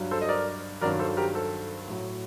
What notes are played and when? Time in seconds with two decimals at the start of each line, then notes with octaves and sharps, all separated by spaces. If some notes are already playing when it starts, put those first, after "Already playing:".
Already playing: G2 F#3
0.11 A4 C5
0.22 D#5
0.29 A#4 D5
0.81 G2 D#3 F#3 A#4 D5
0.99 A4 C5
1.17 G4 A#4
1.35 A4 C5
1.88 A2 F#3